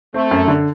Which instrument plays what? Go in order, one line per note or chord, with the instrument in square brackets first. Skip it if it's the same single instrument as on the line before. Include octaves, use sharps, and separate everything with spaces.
[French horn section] A3 [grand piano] C4
[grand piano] F#2
D3